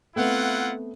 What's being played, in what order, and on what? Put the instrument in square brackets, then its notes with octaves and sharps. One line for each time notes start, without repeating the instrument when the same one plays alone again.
[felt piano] A3 B3 C4 [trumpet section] E4 F4 F#5